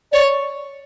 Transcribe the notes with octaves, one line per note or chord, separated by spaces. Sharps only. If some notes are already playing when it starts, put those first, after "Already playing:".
C#5 D5